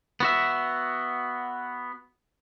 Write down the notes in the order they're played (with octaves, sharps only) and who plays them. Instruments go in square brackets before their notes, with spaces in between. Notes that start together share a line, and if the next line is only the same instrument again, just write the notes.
[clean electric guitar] B3 F#4 E5